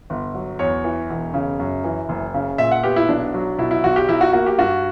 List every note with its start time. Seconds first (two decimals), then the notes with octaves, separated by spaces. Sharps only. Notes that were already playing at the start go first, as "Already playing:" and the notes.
0.10 G1
0.34 F#3
0.59 E2 C#5
0.84 E3
1.10 E1
1.34 C#3
1.59 F#2
1.84 E3
2.09 F#1
2.34 C#3
2.58 A#2 E5
2.71 F#5
2.83 B3 G4
2.96 E4
3.09 B1 D4
3.34 F#3
3.58 B2 E4
3.71 E4
3.83 B1 F#4
3.96 G4
4.09 B1 E4
4.21 F#4
4.33 A#3 F#4
4.46 G4
4.58 G2 F#4